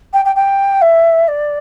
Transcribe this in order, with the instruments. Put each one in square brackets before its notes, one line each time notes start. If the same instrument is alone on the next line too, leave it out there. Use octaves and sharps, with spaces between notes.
[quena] G5
G5
G5
E5
D5